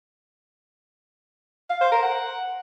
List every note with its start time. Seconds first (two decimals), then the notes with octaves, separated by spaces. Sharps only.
1.70 F5
1.81 C5
1.92 A#4
2.02 F#5